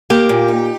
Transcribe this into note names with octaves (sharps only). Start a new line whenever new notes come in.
A#3 G4
A#2
D#4